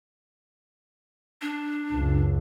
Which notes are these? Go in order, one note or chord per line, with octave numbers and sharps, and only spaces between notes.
D4
C#2 F#2